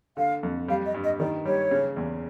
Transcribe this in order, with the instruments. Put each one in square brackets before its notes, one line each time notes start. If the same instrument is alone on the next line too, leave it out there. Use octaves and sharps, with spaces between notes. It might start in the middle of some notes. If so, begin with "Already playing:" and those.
[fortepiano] D3 [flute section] F5
[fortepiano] F2
[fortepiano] G3 [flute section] F5
[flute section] D#5
[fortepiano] G2
[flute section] D#5
[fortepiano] D#3 [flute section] D5
[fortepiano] G3 [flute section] C#5
[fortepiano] C#3
E2